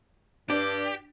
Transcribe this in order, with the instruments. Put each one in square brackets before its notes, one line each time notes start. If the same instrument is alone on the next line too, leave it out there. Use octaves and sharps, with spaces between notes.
[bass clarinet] G2 [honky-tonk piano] D4 [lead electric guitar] G4